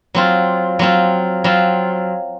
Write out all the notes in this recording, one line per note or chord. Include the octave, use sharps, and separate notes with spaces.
F#3 C4 F4
F#3 C4 F4
F#3 C4 F4